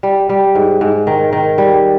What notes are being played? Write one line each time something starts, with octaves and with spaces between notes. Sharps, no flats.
G3
G3
G#2
G#2
D#3
D#3
G3